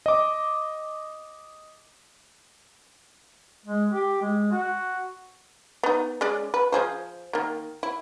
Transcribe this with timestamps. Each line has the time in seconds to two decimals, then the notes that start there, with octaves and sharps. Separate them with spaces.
0.06 D#5 D6
3.65 G#3
3.90 G4
4.22 G#3
4.52 F#4
5.83 B3 D#4
6.21 G#3 C#4 D5
6.54 B4
6.72 F3 G#4 C5
7.33 D#3 A#3
7.83 E4